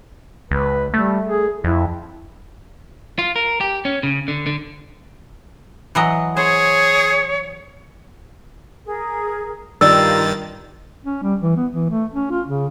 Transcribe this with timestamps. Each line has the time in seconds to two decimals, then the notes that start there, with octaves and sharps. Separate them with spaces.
0.51 C#2 B4
0.94 G3 A3
1.26 G#4
1.64 F2 E4
3.19 F4
3.36 A#4
3.61 G4
3.85 C#4
4.03 C#3
4.28 D3
4.47 D3
5.95 E3 F#3 D#5
6.37 G#4 C5 C#5
8.86 G#4 A#4
9.81 G2 D#3 F4 G4 A#4 D5 E6 A6
11.05 C#4
11.23 G3
11.42 E3
11.57 B3
11.73 E3
11.90 A3
12.14 C#4
12.31 F4
12.47 C#3